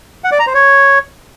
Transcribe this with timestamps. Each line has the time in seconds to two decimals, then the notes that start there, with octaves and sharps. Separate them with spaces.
0.24 F#5
0.32 D5
0.39 A#5
0.47 C5
0.54 C#5